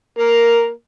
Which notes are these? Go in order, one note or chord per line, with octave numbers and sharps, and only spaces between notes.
A#3 A#4